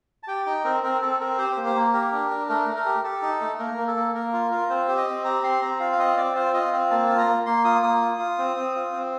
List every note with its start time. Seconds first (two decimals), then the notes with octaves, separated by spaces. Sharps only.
0.23 A5
0.28 G4 G5
0.46 D#4 G5
0.64 C4 A#4
0.83 C4 A#4
1.02 C4 A4
1.20 C4 A#4
1.38 G4 C5
1.52 C5
1.57 A#3
1.66 C5
1.75 A#3
1.94 G4 A#4
2.12 D4
2.30 D4
2.49 A3 A#4
2.67 A3
2.76 A#4
2.86 G4
3.04 G4 A4
3.22 D#4
3.41 A3
3.59 A#3 A#4
3.78 A#3
3.87 A4
3.96 A#3
4.14 A#3 A#4
4.33 F4
4.51 F4
4.70 C4 C5
4.88 G4
4.97 D#5
5.07 C4
5.25 G4 A#5
5.43 C4 C6
5.62 C4 A#5
5.80 F4 F5
5.93 F5
5.98 C4 D#5
6.17 C4 D5
6.35 F4 C5
6.54 F4 D#5
6.73 C4
6.91 A#3 A5
7.09 F4
7.19 A#5
7.28 A#3
7.46 A#3 C6
7.64 F4 D#6
7.83 A#3 D#6
8.01 F4
8.19 F4
8.38 C4
8.56 C4
8.75 F4
8.93 C4